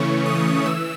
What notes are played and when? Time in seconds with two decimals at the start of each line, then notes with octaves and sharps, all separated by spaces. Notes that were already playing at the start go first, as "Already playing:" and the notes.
Already playing: C#3 E3 A3 C#4 C#6
0.25 D#6
0.65 E3 E6